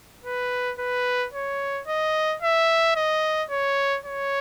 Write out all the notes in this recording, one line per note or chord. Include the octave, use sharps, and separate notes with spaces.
B4
B4
C#5
D#5
E5
D#5
C#5
C#5